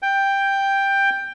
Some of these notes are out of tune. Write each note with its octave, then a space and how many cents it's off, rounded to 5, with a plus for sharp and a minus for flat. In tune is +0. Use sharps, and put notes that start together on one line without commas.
G5 +5